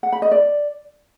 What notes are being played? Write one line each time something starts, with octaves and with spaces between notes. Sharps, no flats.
F#5
B5
D#5
D5